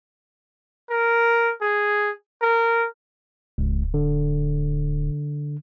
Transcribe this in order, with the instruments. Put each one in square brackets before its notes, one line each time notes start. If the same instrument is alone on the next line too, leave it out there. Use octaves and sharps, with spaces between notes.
[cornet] A#4
G#4
A#4
[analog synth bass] D1 [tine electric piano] C#2
[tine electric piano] D3